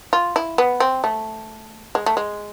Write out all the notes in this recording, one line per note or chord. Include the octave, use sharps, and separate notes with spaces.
F4
E4
B3
C4
A3
G#3
A3
G#3